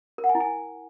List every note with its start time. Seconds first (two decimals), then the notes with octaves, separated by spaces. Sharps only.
0.18 A#4
0.24 F#5
0.29 G#5
0.35 E4
0.40 G#5